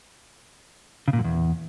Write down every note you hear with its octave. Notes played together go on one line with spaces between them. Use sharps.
C#3
A#2
F#2
E2